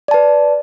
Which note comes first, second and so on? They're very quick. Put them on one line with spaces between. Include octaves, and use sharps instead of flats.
D5 A5 B4